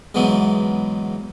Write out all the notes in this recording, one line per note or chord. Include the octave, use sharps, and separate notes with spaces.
E2 G#2 E3 F#3 G#3 B3